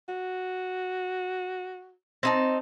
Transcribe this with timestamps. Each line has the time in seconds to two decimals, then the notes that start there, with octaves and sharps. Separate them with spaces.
0.09 F#4
2.23 C4 D#4 A5